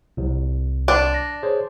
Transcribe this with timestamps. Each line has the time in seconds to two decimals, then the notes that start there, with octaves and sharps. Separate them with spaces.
0.17 C2
0.88 D4
1.14 A#6
1.43 G#4 C5 C#5